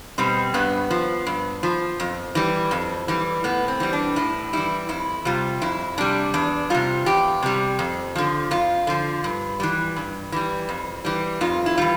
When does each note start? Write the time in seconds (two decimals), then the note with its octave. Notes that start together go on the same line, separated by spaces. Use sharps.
0.18 B2 G3 C4
0.54 G2 B3
0.90 F3
1.27 G2
1.63 F3
2.00 F2
2.35 E3 G3
2.71 F2
3.08 E3 G3
3.44 A2 B3
3.68 C4
3.80 E3 G3
3.93 D4
4.16 A2 E4
4.53 E3 G3 E4
4.89 F2 E4
5.25 C3 G3 F4
5.62 F2 E4
5.98 C3 G3 D4
6.34 E2 D4
6.70 C3 G3 F4
7.06 E2 G4
7.43 C3 G3
7.79 F2
8.16 D3 F3
8.51 F2 F4
8.87 D3 F3
9.24 G2
9.60 E3 G3
9.96 G2
10.32 E3 G3
10.69 F2
11.05 E3 G3
11.41 F2 F4
11.66 E4
11.78 E3 G3 F4